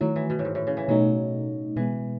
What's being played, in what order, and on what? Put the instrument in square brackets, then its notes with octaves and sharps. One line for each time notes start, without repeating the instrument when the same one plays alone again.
[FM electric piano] D#3 A3 E4 [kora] F#3
[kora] E3
B2
A2
G#2
A2
C#3
E3
[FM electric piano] B2 A3 D#4 [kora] F#3
[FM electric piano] B2 G#3 B3 [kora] E3